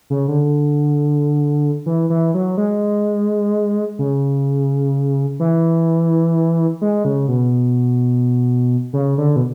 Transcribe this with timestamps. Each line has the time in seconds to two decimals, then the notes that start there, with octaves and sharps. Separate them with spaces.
0.10 C#3
0.28 D3
1.86 E3
2.10 E3
2.34 F#3
2.57 G#3
3.99 C#3
5.40 E3
6.81 G#3
7.05 C#3
7.28 B2
8.93 C#3
9.18 D3
9.36 B2